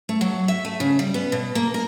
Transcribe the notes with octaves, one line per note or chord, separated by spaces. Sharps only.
A3
F#3
E5
A3
C#3
G3
B3
B2
A#3
A#4